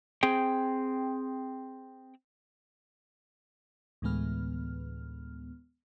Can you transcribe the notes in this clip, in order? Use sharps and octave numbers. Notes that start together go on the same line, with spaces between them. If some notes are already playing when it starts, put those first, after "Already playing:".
C4 G#4 G5
D2 A2 E3 G#3 B3 F6